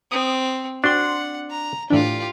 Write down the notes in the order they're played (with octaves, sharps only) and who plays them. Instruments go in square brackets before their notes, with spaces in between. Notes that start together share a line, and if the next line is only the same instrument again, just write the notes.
[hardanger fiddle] C4 [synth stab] D#6
[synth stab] C4 F#4 C6 [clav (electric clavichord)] D4 [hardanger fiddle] F#5
[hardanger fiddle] A#5
[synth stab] A2 E3 D4 [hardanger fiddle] F4 G4